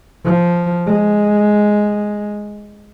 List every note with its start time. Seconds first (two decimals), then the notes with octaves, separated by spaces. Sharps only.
0.25 F3
0.87 G#3